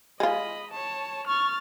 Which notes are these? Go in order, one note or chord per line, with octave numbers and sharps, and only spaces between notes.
G#3 F4 D#5 B5
C#5 A5
C#6 F6 A6